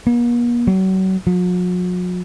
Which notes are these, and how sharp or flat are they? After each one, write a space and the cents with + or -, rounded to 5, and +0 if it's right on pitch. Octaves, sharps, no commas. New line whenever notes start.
A#3 +45
F#3 +35
F#3 -45